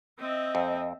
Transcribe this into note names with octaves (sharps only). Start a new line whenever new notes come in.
C4 D#5 E5
F2